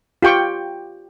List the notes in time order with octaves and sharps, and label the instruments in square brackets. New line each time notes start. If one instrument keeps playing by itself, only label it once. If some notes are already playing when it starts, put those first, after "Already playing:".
[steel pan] F4 G4 G5 C#6